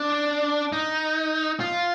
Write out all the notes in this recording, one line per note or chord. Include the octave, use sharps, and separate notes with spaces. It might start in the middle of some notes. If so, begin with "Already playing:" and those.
Already playing: D4
D#4
F4